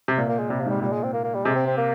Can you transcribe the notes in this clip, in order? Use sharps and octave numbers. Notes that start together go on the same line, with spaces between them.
C3
A#2 A#3
A#3
G#3
C3 G3
F3
G#2 G3
A#2 G3
G#3
C4
A#3
A#3
G3
C3 G#3
C4
C4
A#3